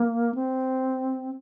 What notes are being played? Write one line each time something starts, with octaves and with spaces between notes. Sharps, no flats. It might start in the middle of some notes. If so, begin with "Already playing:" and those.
Already playing: A#3
C4